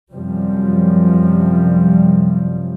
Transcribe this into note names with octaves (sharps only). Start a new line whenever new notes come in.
F#2 C3 F3 G3